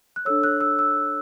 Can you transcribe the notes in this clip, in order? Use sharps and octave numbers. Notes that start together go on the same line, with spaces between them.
F#6
D4 A4 C#5 E6
F#6
E6
E6